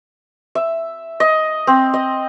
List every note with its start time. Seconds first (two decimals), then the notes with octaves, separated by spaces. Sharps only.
0.55 E5
1.20 D#5
1.67 C4
1.94 D#5